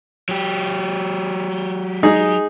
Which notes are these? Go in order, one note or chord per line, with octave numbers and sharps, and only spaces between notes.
F#3 G4
G#3 D#4 G#4